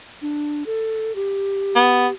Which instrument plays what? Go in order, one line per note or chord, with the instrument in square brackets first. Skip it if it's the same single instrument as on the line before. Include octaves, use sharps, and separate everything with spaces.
[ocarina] D4
A4
G4
[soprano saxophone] B3